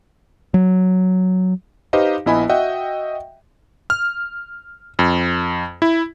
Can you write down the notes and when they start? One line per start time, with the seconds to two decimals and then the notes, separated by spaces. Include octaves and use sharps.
0.54 F#3
1.93 D#4 G4 B4 C5 D#5 F5
2.26 A#1 B3 E4 D#5 G#5 B5
2.49 F#4 D#5 E5 F#5 G5
3.90 F6
4.99 F2
5.82 E4